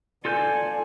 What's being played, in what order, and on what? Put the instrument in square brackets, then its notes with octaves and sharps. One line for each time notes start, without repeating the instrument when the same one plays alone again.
[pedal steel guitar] F4 A4 G6 [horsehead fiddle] D5 G#5